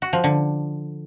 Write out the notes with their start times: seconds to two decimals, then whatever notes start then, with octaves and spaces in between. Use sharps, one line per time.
0.02 F#4
0.13 F3
0.24 D3